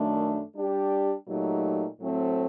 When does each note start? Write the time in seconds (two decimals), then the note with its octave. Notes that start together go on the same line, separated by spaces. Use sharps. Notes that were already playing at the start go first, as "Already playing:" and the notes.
Already playing: F#2 D#3 A3 D4
0.55 G3 D4 G4
1.27 A#2 F#3 A3 D#4 G4
2.00 A2 F#3 A3 C4